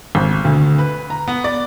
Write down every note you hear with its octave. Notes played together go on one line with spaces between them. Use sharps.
G#1
D2
B4
A#5
B3
D5